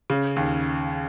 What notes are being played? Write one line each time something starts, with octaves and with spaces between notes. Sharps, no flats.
C#3
D#2